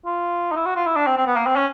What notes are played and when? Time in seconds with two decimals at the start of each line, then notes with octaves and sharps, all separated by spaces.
0.06 F4
0.52 D#4
0.56 E4
0.66 F#4
0.76 F4
0.87 E4
0.96 D4
1.06 C4
1.17 C4
1.26 B3
1.36 A#3
1.46 C4
1.56 C#4